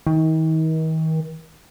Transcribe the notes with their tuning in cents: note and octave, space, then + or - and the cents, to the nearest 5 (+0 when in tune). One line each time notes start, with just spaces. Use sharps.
D#3 +40